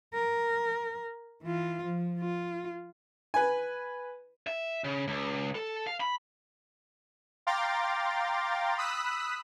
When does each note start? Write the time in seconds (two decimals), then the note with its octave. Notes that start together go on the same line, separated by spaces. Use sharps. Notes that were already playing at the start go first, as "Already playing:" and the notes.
0.14 A#4
1.43 E3 F4
1.83 F3
2.20 F4
3.34 B4 G#5
4.47 E5
4.84 C#3
5.08 C#2
5.55 A4
5.87 F5
6.00 B5
7.47 F5 G5 A#5 C6 D6 A6
8.78 B5 D#6 E6 F#6 B6